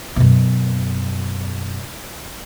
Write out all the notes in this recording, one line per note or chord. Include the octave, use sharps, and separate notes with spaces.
F#2 B2